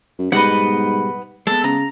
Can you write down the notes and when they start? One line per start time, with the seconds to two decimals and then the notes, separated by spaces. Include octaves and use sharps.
0.19 F#2
0.32 G#2 B2 G3 B3 B4 D#5 F#5
1.47 G#3 B3 A4
1.64 C#3 A#5